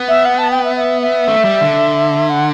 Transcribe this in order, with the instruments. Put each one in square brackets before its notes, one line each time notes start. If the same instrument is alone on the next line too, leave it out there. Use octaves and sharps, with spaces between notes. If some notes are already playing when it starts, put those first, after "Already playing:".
Already playing: [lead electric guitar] B3
[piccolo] E5
F#5
A5
G5
E5
E5
E5
[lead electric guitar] A3
G3
D3
[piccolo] F#5